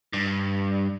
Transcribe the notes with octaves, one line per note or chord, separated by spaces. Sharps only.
G2